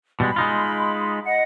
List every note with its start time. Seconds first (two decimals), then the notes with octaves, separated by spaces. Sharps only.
0.20 B2 G3 G#3 B5
0.36 G#3 D#4 F4
1.25 D#5 F#5